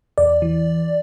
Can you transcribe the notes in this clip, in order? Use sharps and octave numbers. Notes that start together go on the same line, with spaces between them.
E2 D5
E3